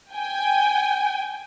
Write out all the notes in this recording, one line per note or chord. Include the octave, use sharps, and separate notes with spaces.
G5 G#5